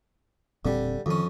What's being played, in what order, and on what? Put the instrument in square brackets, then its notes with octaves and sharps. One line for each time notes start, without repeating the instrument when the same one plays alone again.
[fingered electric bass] E1 A#2 C4 [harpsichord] D3 G3
[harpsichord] F2 C#4 [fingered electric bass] D#3